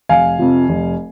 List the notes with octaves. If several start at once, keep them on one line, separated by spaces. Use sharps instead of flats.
F1 F5 G#5
F2 C3 F3
F1